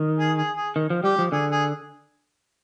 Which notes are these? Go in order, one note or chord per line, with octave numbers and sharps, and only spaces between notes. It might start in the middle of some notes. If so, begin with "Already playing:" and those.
Already playing: D#3
G#4
G#4
G#4
D#3
F3
G3 G4
F3
D3 G#4
G#4